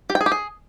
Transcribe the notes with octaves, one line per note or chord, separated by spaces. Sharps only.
G4
G5
G#4
G4
G#4